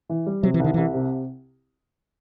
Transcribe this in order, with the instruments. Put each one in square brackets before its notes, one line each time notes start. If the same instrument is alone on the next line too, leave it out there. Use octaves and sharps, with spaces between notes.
[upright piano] E3
G3
[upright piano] C3 [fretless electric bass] F#3
[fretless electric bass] E3
[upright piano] C2 [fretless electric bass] D#3
[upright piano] C2 [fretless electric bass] E3
[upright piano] C3